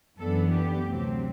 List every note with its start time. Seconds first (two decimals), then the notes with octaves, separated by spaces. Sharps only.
0.19 F#2 E3 B3 D4 A4
0.53 G4
0.88 D2 C3 F#3 C4